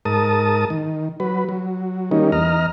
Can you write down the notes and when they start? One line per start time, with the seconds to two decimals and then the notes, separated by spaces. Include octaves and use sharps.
0.05 G#2 A#4 A5 D#6
0.70 D#3
1.20 F#3 B4
1.49 F#3
2.11 D#3 G3 A#3 C#4 D#4
2.32 E2 D#5 A#5 F6